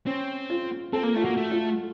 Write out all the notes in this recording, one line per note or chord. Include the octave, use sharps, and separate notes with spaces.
C4 C#4
F4
C4 A4
A#3
A3 F4
A#3 F#4
A3
F4